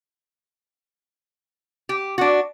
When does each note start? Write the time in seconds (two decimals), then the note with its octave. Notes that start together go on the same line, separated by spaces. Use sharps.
1.89 G4
2.18 D4 F#4